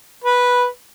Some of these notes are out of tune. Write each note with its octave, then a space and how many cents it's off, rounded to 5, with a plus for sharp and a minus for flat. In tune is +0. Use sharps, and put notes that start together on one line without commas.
B4 -5